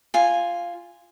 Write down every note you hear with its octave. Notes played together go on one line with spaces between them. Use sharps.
F4 G#5